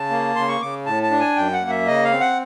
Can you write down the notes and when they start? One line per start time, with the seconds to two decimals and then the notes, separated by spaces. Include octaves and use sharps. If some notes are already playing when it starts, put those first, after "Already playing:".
Already playing: C#3 A5
0.10 A#3
0.36 C#3 C6
0.48 C#6
0.61 C#3 D6
0.86 A2 A5
1.03 A5
1.11 D4
1.20 G#5
1.36 F#2 G5
1.53 F#5
1.62 A#3
1.70 E5
1.86 C#3 D#5
2.04 F5
2.12 C4
2.20 F#5